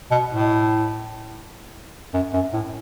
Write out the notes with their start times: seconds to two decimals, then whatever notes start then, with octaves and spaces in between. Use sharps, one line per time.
0.11 B2
0.31 A2
2.14 F#2
2.33 F#2
2.53 A2